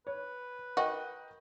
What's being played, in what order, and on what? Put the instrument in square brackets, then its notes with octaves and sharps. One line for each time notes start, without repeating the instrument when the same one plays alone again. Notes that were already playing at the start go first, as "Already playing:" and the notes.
[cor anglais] B4 [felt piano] C#5
[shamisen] F#4 [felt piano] A#4 D#5 G5